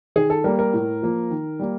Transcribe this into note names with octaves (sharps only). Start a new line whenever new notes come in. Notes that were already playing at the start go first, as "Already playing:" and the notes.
D#3 G#4
A4
G3 A#3 A#4
A#4
A2
F3 A#3
D#3
G3 A#3